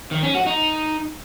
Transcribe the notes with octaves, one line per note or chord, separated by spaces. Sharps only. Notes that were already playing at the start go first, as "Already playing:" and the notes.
D#3
C#4
F#4
D#4